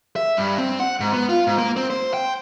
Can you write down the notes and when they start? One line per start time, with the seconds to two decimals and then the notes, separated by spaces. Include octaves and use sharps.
0.16 E5
0.37 G2
0.58 C4
0.80 F#5
1.00 G#2
1.13 B3
1.29 F4
1.47 G#2
1.58 A#3
1.76 C4
1.90 C5
2.14 G5